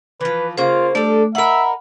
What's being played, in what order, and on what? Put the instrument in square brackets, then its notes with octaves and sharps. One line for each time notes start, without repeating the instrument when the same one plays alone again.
[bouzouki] E3 F3 [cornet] B4
[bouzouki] C#3 A#3 [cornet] F4 [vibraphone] C5
[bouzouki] G3 A4 [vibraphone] A3 [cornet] D4
[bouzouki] D#4 A#4 [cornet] E5 [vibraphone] F#5 B5